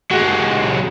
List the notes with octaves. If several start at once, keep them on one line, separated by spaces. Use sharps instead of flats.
F#3 G#3